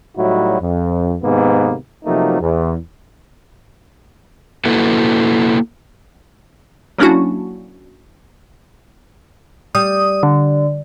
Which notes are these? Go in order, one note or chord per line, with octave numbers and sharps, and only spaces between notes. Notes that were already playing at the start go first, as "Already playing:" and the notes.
A2 F#3 G3 D#4 E4 F#4
F2
G#2 C3 D#3 A#3 B3
C3 F3 F#3 A3 A#3 D#4
E2
A#3 E4 F#4 A4 B4
F#3 A#3 C#4 D4 E4 F#4
G3 D#6
D3